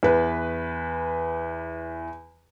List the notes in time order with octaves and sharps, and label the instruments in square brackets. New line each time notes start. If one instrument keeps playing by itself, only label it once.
[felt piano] E2 B4